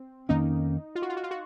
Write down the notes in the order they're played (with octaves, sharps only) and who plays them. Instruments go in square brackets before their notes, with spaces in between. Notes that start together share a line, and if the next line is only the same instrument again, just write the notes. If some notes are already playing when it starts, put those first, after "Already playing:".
Already playing: [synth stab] C4
[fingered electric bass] F2 D#3 A#3 C#4 [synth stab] D#4
[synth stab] F4
F#4
F4
F#4
F4
F#4